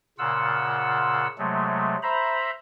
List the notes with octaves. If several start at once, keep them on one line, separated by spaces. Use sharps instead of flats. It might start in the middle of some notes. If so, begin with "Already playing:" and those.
A#2 C#3 F4 F#5 E6
C3 F#3 G#3 A3
C5 E5 A#5 B5